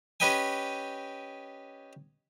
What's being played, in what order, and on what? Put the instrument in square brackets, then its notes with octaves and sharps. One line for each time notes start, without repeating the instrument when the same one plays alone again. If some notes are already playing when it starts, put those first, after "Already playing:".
[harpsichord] C#4 G4 B4 D#5 G5 G#5